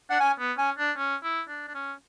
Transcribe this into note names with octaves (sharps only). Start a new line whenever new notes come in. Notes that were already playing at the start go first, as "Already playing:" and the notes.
D4 F#5
C#4 G#5
B3
C#4 G#5
D4
C#4
E4
D4
D4
C#4